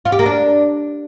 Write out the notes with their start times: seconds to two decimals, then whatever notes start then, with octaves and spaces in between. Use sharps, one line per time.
0.05 F4
0.12 G4
0.19 A#3
0.26 D4